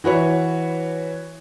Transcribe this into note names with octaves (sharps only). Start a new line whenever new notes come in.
E3 F#4 B4 C#5